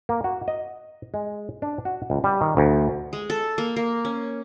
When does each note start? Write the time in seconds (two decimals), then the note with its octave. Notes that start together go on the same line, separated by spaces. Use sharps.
0.09 A#3
0.24 F#4
0.48 D#5
1.14 G#3
1.62 D4
1.85 F#4
2.10 C#2
2.24 G3
2.41 D#3
2.57 D2
3.13 G#3
3.30 A4
3.58 A#3
3.76 A#3
4.05 C#4